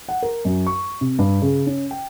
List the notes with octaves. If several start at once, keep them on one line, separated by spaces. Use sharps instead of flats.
F#5
A#4
F#2
C#6
C3
G2
C#3
C#4
G5